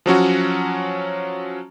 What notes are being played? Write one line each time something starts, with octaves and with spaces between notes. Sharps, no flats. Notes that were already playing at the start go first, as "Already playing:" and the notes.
F3 F#3 C#4 F#4